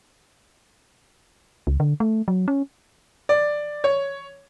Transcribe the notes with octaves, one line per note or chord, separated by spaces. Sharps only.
C#2
D3
A3
F#3
C#4
D5
C#5